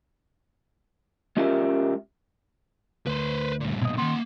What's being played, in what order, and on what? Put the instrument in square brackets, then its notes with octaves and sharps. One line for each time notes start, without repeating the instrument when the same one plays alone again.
[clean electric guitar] G#3 C#4 F4 G4 A#4 E5
[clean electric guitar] D2 [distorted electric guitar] B4 C5
[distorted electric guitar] G2 A#2
[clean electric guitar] B2 D#5
[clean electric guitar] D#3 C6 [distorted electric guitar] A#3 F#5